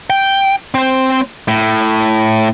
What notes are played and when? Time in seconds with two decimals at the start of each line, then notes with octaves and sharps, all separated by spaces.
0.10 G5
0.74 C4 C5
1.48 A2